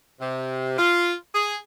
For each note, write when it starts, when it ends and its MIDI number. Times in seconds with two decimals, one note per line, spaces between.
0.21 0.77 48
0.79 1.14 65
1.35 1.56 68